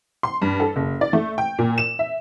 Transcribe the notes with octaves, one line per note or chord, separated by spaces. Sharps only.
C6
G2
A4
F#1
D5
A3
G5
A#2
E7
E5